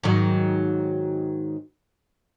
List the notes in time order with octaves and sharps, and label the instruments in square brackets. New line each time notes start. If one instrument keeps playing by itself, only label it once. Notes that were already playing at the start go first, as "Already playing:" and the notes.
[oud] G#2 D#3 F#3